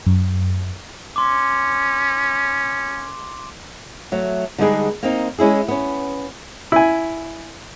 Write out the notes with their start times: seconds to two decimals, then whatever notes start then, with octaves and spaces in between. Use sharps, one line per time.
0.06 F#2
1.16 C#4 C6 D6
4.12 F#3 A3
4.58 D3 G3 G#3 B3 D#4 G#4
5.03 A#3 C4 D#4
5.39 G#3 C#4 E4 G#4
5.68 B3 C#4
6.72 E4 G#5